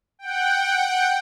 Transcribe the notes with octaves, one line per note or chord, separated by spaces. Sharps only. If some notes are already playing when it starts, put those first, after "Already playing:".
F#5 G5